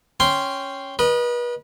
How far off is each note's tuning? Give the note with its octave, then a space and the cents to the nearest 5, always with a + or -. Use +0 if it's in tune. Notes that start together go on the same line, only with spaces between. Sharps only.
C#4 +0 G5 +0 C6 +0
B4 -35 D#5 -15